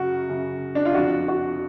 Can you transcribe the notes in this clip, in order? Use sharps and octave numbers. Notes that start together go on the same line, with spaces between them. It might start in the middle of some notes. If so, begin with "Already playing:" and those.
Already playing: F#2 C#3 F#4
F#2 C#3
D4
F4
F2 D3 F#4
F#4